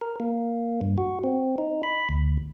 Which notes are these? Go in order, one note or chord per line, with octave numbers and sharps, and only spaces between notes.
A#4
A#3
G2
F#4
C4
D#4
B5
D2